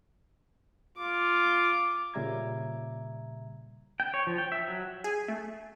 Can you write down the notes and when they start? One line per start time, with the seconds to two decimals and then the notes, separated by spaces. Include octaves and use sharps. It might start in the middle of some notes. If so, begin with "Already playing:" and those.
0.98 F4 D6
2.14 A#2 C#3 G3 E5 A#5 G#6
4.00 G5
4.14 C#5
4.27 F3
4.38 G5
4.52 E5
4.68 F#3
5.04 G#4
5.28 A3